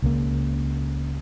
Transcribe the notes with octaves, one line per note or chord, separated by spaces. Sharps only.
C#2 C#3 A#3